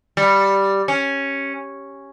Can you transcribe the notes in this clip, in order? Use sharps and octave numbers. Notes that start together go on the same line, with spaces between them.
G3
C#4